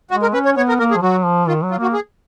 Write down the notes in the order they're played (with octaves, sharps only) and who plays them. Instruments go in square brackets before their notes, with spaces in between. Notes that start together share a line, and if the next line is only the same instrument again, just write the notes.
[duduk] G#3 [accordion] F#4
[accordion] A#4
[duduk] C#4 [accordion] B4
[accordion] C#5
[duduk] B3 [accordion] C#5
[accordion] A#4
[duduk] A#3 [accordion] A#4
[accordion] G#4
[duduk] F3
[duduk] F#3 [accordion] F#4
[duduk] F3
[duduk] D#3 [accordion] F4
[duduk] F#3
[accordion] F4
[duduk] A#3 [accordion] F#4
[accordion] G#4